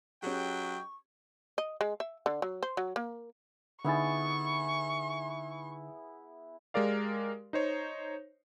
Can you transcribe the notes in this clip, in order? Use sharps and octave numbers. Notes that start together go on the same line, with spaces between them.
F#3 C#4 G4 G#4 B4 D#5 G5 C#6
D#5
G#3
E5
D3
F#3
C5
F#3
A#3
D3 B3 D#4 E4 G#4 C#6 A6
G#3 G4 A#4 D5 F5
D#4 C5 C#5